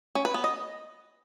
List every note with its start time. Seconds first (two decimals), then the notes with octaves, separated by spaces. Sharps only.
0.15 C#4
0.25 B4
0.34 B3
0.44 D#5